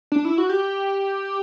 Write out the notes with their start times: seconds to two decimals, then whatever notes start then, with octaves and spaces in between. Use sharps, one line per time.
0.12 D4
0.25 E4
0.38 F#4
0.49 G4